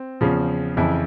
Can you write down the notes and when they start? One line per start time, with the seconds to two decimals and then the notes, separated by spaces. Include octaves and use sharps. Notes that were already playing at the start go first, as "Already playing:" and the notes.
Already playing: C4
0.21 E2 C#3 F3
0.77 F2 C#3 E3 E4